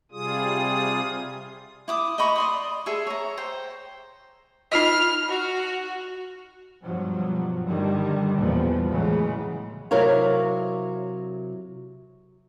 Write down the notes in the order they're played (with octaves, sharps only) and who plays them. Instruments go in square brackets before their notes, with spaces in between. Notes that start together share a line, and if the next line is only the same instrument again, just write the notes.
[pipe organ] C3 G3 F4 G#4 D#6
[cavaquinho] E4 D6 D#6
D#5 A#5 B5 C#6
D5 C6 D#6
G#4 A4 E5
C#5 A#5
C5 G5
[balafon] D#4 F4 D#5 [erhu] F6
[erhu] F#4
[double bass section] G2 B2 F3 F#3
G2 D3 D#3 G3
B1 E2 A#2 E3 F3 G3
A2 C#3 E3 F#3 G#3
[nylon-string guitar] C3 F#3 E4 A#4 C#5 F5